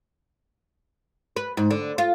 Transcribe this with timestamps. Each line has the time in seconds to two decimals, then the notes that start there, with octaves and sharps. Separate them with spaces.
1.36 B4
1.57 G#2
1.70 D3
1.98 F4